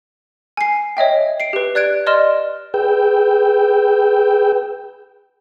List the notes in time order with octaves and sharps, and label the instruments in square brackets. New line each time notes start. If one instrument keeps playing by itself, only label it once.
[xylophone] G#5 C7
C#5 D#5 E5 G5
C7 D7
G4 B4
D5 F#6 G#6 D7
D5 D#5 C6 F6 E7
[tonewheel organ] G#4 B4 G5 E6 G6